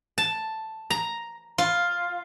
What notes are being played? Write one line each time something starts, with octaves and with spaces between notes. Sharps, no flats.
A5
A#5
F4